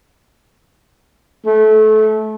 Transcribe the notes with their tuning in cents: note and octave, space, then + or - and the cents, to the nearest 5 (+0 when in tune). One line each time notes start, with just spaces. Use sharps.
A3 -25